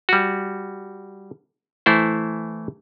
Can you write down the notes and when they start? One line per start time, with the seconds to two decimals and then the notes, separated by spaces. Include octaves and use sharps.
0.09 G3 F#4
1.86 E3 A3 E4 C5